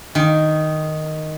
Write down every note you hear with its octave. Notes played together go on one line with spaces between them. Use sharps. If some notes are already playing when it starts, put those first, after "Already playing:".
D#3